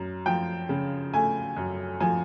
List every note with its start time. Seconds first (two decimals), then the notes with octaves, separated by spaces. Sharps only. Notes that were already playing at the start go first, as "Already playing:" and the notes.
Already playing: F#2
0.26 F3 G5
0.69 C#3
1.13 A3 G#5
1.57 F#2
2.00 F3 G#5